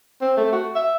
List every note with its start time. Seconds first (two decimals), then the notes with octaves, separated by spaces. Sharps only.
0.21 C4
0.37 A3
0.52 F#4
0.75 E5